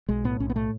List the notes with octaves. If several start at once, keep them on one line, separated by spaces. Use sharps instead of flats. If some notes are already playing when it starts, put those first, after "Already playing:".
B1 G#3
A2 B3
B1 C#4
B3
A2 A3